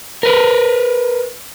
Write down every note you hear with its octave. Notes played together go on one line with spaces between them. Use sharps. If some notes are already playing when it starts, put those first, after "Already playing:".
A#4 B4